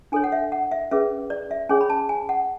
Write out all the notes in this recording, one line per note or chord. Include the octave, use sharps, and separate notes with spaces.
D4 A4 C#5 G#5
F#5
E5
F#5
E5
C#4 G#4 B4 E5
D5
E5
C#4 G#4 C#5 G#5
B5
A5
G#5
F#5